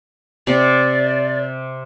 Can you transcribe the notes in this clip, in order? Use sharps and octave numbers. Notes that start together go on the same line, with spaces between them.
C3 D5